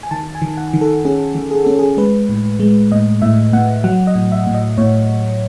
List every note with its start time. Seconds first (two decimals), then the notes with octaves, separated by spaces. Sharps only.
0.03 G#5
0.11 D#3 A5
0.35 G#5
0.42 D#3
0.57 F#5
0.73 D#3
0.81 A4
1.05 C#4 G#4
1.35 D#3
1.51 G#4
1.65 C#4 A4
1.79 G#4
1.97 G#3 B4
2.29 A2
2.60 G#3
2.92 A2 D#5
3.22 A2 E5
3.53 A2 F#5
3.84 F#3 F#5
4.07 D#5
4.15 A2
4.32 E5
4.47 A2
4.54 D#5
4.78 A2 C#5